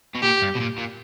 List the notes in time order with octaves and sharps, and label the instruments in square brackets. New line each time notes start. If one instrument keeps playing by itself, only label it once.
[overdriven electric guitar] B2
[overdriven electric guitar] A#2 [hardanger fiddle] G4
[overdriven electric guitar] G2
B2
A#2
A#2